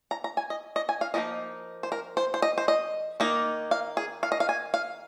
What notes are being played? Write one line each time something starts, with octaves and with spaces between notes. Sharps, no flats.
A#5
A#5
G#5
D#5
D#5
G#5
F5
F3 A#3 D#4 D#5
C5
A#4
C5
C5
D#5
C5
D#5
D#3 A#3 D#4
F5
G#4
F5
D#5
F5
G#5
F5